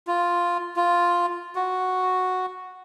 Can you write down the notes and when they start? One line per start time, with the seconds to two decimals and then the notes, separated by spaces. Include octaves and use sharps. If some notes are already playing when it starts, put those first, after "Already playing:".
0.07 F4
0.76 F4
1.55 F#4